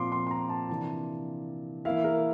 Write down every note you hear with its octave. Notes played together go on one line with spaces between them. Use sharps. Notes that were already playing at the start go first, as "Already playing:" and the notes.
Already playing: A#2 F3 C4 F4 C6 D6
C6
C6
A#5
A5
C3 E3 A#3 D4 A5
E3 A#3 E4 F5
A#4